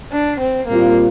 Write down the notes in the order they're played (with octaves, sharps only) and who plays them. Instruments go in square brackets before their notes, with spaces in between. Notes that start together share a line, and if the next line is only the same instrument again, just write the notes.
[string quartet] D4
C4
[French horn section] A#2 G3 C4 F4 [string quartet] A#3